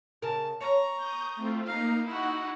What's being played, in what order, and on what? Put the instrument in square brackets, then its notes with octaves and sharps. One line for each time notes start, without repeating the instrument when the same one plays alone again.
[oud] C#3 A#4 [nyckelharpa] A5
[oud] C#5 [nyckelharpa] A#5 C#6
[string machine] D#6 G6
A3 C4 F4
[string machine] A#3 D#4 [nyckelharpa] F5 A#5
[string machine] D#4 F#5 [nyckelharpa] E4 F#4